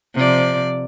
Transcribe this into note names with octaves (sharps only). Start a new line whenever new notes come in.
C3 F3 D5